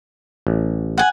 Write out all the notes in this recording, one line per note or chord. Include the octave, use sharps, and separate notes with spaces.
A1
F#5 G#5